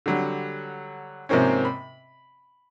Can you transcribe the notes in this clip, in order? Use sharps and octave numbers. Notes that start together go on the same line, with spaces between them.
D3 F#3 G3
G#2 C3 F3 A#3 C4 C#4
B5